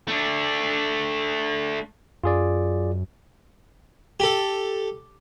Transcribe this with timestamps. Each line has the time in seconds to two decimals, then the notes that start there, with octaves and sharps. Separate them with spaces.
0.08 A3 D4
2.24 F#2 F4 G#4 D5
4.20 G4 A4